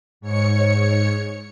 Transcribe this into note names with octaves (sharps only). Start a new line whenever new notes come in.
G#2 C#5 C#7